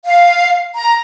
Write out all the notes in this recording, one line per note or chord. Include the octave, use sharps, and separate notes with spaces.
F5
A#5